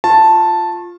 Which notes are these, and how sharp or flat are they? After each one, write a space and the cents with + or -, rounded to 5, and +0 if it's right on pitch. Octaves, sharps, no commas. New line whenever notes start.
F4 +0 A5 +0 C#6 -35